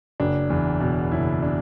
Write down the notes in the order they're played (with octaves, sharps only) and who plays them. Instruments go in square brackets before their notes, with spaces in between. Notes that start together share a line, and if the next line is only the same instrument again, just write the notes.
[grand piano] F#1 D4
E2
B2
F#1 E4
D4